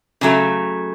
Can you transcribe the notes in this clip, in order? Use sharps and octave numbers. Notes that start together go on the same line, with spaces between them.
C#3 F#3 A3